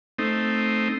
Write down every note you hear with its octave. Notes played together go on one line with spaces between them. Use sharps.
A3 C4 D#4